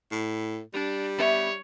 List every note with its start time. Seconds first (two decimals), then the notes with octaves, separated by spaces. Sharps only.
0.12 A2
0.74 G3 D4
1.18 B3 B4 C#5 E5